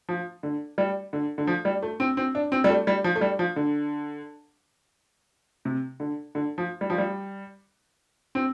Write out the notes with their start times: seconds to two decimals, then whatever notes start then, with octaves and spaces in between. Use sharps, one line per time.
0.09 F3
0.43 D3
0.78 G3
1.13 D3
1.38 D3
1.47 F3
1.65 G3
1.83 A3
2.00 C4
2.17 C4
2.35 D4
2.52 C4
2.64 G3
2.69 A3
2.87 G3
3.04 F3
3.16 A3
3.21 G3
3.39 F3
3.56 D3
5.65 C3
6.00 D3
6.35 D3
6.58 F3
6.81 G3
6.90 F3
6.98 G3
8.35 C4